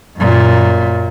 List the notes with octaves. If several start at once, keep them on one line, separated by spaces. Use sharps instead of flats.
F#2 A#2